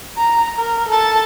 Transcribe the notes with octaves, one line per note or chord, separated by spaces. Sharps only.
A#5
A#4
A4 A5